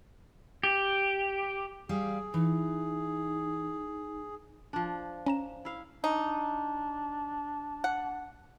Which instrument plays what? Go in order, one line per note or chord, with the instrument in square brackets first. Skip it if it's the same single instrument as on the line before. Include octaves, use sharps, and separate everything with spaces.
[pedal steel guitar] G4
[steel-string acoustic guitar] G3 F5 [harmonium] G#4
[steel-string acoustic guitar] E3 [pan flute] D#4
[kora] F3 D4
[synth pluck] C#4 A#5 E7
[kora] E4 F5
[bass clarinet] D4 [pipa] D#4
[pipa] F#5